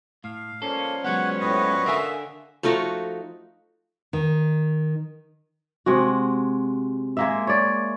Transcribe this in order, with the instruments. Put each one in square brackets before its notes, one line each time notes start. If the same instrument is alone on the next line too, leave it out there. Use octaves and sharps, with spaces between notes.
[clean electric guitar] A2 [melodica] F5
[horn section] F3 G3 C#4 [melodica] A#3 F5 [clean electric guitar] A4
[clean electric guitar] F#3 G#3 B3 [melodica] C#5 [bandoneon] F#5
[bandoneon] A2 [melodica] F#4 B4 D#5
[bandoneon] D3 [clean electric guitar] A#4 F5 G#5 [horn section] E5
[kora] F3 A3 D#4 F#4
[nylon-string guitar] D#3
[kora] C3 G#3 F#4
G#3 A#3 E5
C#5 D5